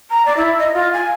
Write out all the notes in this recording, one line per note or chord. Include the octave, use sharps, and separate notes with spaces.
A#5
D5
E4
D#5
F4
G#5